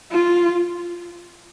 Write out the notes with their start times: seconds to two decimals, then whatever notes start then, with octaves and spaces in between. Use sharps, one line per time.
0.11 F4